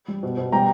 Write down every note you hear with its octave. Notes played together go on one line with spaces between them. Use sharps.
G3
B2
B2
G3 G5 A#5